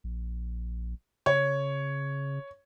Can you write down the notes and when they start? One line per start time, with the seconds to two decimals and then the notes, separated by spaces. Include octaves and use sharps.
0.04 A#1
1.26 C#3 C#5